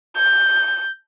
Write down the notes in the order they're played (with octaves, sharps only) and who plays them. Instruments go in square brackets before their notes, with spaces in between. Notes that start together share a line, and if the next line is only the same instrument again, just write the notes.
[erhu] G6